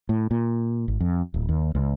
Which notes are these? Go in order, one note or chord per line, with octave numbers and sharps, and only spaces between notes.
A2
A#2
G#1
F2
D1
D#2
C#2